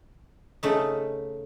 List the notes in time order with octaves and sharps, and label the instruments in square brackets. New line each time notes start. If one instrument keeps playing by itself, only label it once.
[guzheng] C#3 A3 D#4